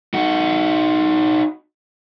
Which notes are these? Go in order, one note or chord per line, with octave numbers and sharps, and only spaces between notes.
D#4 F#4